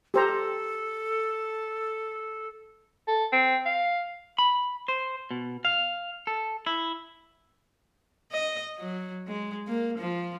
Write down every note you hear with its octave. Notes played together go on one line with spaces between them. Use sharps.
G4 A4 C5 A#5
A4
C4
F5
B5
C5
B2
F5
A4
E4
D#5
F#3
G#3
A#3
F3